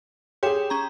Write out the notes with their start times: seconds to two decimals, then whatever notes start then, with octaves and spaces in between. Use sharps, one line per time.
0.43 G4 G#4 C#5 C6 E7
0.70 C#4 A#5